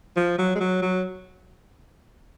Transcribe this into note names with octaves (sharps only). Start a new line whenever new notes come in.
F3
F#3
G#3
F#3
F#3